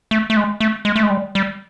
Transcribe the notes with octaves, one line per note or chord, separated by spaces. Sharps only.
A3
A3
G#3
A3
G#3
A3
G#3
G3
G3